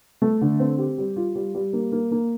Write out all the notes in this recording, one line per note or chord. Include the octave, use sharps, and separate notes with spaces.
A3
D3
C4
G4
G3
F4
G3
G3
A#3
A#3
A#3